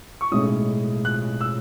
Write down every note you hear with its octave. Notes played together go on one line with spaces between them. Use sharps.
C#6
B1 A2 G#3 C#4 D#6
F#6
E6